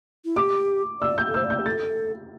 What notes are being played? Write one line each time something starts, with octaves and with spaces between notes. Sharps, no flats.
E4
G4 D6
D5 E6
G6
A4
C5 E6
D5
G6
G4
A4 A6